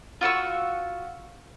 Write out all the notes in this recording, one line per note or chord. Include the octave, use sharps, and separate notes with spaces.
F4 F#4 C#6 E6